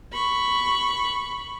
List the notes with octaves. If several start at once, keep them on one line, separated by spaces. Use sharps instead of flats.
B5 C#6